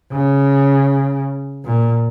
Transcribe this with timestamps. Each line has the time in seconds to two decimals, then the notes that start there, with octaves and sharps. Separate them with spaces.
0.13 C#3
1.65 A#2